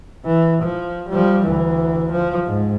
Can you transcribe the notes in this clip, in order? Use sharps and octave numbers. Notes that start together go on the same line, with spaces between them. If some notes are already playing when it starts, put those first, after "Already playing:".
E3
F3
F3 G3
D2 E3
F3
G#2